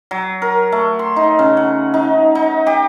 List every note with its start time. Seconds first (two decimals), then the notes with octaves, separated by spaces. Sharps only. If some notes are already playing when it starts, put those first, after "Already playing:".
0.11 F#3
0.42 A#4
0.72 A3
0.99 C6
1.16 D#4
1.39 C#3
1.57 F#5
1.94 D#4
2.35 D#4
2.67 G4